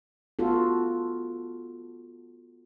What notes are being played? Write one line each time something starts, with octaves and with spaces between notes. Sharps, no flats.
B3 F4 F#4 A4